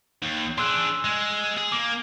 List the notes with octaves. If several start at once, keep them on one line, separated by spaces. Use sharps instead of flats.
D#2
D4 G#4 C6 E6 F#6
G#3
G#4
A#3 D6